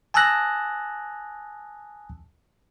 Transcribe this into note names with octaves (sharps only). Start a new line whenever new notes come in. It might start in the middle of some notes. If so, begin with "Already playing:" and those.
G#5 A5 D#6 E6 F#6 A#6